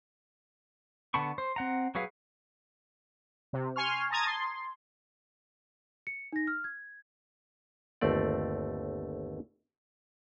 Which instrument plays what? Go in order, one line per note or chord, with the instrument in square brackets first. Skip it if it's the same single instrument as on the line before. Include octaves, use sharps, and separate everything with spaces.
[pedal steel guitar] D3 B3 A5 B5 C#6
C5
C4 F#5 A#5
F#3 F#4 G#4 B4 F5
[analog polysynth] C3
G#5 C6 C#6 F6
A5 A#5 D#6 G#6 A6
C6
[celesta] C#7
D#4 A#6
F6
G#6
[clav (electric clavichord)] G1 D#2 A3 C4 D5